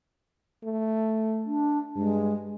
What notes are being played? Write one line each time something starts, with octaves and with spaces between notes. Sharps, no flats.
A3
D4
G2 G#3